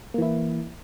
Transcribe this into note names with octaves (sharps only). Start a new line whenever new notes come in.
E3 A#3 E4